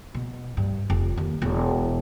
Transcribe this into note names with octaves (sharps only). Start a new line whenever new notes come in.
B2
G2
F1
D#2
E1